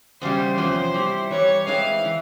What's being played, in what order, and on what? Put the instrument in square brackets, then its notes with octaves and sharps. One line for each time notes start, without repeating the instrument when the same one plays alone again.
[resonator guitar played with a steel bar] E2 C#3 G3 [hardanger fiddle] C5
[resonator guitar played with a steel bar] E2 C3 F3 C#4 [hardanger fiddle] C5
[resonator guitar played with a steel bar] G3 C4 E4
[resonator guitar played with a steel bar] E3 G3 C4 [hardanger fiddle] C#5
[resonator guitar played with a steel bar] E3 G#3 C4 E4 [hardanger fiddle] F5
[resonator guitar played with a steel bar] E3